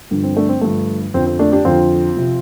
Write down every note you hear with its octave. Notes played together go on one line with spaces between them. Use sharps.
G2 D3 F3
C4
A3 D4
C4
G2 D3 F3 A3
F2 D3 F3 C4
C4
A3 D4
D4 G4
F2 D3 F3 C4 F4
C3 F3